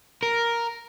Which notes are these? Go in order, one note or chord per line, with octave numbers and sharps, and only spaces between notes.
A#4